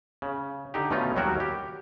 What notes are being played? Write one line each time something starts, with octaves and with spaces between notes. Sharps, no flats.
C#3
D3 D#4 G4
B2 D#3 A3 C#4 D#4 F4
D#2 F#3 G3 F#4 A#4 G5
G4